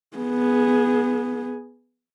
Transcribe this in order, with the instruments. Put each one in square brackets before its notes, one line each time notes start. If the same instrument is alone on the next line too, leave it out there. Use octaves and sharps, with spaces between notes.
[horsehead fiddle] B3 G#4